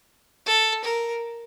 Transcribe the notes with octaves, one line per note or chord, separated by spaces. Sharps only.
A4
A#4